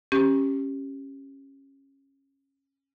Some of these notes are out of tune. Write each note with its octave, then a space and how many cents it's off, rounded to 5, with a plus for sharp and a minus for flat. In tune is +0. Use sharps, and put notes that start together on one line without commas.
C#4 -15 G4 +0